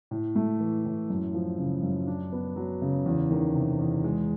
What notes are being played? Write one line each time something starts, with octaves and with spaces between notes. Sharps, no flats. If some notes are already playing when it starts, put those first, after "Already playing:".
A2
A3
E3
A2
F#2
F3
C#3
F#2
D4
B3
F#3
C#3
E2
D#3
C3
E2
G#3